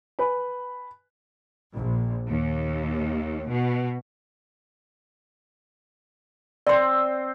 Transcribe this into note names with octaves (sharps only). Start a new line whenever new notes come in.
B4 G#5 B5
A#1
D#2
B2
C4 C5 D5 C6